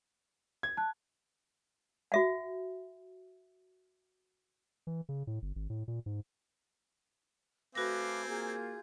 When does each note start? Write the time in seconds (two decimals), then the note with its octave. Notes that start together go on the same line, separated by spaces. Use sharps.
0.63 G#6
0.77 A5 F#6
2.12 F#4 E5 F#5
4.87 E3
5.09 C#3
5.27 A2
5.42 G1
5.56 G#1
5.70 A2
5.88 A#2
6.06 G#2
7.75 A3 C4 F#4 B4 F5 G#5 D6 A#6
8.27 A#3 F4 G#4 G6